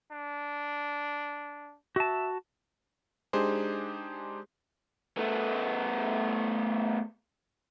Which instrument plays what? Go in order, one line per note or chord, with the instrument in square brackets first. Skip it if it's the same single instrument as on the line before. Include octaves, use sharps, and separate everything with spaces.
[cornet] D4
[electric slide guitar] F#4 A5 [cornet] E5
[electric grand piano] G#3 D4 D#4 G4 G#4 C5
[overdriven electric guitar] A3 B3